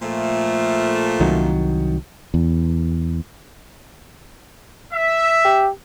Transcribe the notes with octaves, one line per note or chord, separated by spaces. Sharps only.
A#2 F3 A3
C2 D#3 F#3
E2
E5
G4